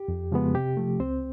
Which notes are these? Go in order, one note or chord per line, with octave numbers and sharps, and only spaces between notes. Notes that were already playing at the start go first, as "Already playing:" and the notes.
Already playing: G4
F2
C#3 F3 G#3 B3
C3 G4
F3 A3
C#2 C4 C5